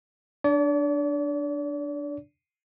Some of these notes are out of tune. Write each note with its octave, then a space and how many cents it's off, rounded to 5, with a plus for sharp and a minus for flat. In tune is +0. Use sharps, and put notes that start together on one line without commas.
D4 +0 D5 -40